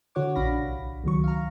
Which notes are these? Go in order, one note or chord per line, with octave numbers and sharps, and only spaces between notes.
D3 F#4 C#5 F#5 D6
A#1 D4 F5 B5 A#6
C2
C#2 D#3 F#3 C#6
F5 A#5